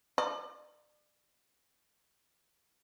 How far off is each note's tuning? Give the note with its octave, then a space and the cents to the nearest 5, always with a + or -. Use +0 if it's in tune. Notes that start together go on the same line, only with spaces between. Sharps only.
D5 +35